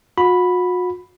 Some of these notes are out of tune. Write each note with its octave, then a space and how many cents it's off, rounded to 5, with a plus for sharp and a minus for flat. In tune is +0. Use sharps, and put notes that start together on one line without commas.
F#4 -40 B5 +0